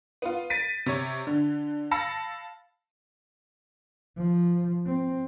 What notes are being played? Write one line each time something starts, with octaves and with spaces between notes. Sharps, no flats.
B3 F4
A6 B6 D7 D#7
C3 C#5 G#6
D3
F5 A5 B5 E6 A#6 C#7
F3
C4